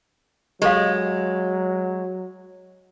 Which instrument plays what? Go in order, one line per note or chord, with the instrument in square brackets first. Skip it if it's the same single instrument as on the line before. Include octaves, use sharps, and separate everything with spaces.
[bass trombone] F#3 [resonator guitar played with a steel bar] G#3 [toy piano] G4 A4 F5